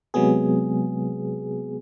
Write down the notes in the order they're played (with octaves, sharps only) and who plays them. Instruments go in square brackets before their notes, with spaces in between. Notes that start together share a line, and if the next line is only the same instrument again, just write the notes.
[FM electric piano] C3 F#3 G#3 B3 G#4